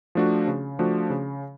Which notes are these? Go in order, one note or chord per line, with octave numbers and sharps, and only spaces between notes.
F3 A3 D4 F#4
C#3
F3 A3 D4 F#4
C#3